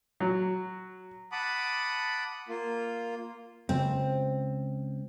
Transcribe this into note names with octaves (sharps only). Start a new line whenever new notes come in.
F#3
F#5 A5 B5 D6 D#6
A#3 F4
C#2 C4